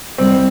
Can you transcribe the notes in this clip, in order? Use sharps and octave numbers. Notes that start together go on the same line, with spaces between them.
C2 B2 G3 C4